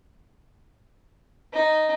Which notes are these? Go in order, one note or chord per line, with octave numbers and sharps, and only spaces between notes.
D#4